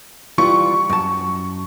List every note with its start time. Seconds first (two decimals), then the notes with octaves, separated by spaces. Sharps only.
0.38 E3 G3 F4 C#6
0.90 F#2 A5